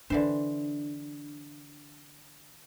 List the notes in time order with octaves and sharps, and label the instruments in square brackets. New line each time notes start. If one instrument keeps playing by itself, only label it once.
[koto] D3 E3 C5 [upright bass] D4